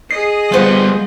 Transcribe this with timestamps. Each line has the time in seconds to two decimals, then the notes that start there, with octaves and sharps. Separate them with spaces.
0.11 G#4 D#5 C7
0.52 G3 B3 F4 C5 F#5